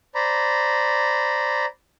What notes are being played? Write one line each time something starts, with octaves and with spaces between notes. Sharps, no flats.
C5 D5 A#5 B5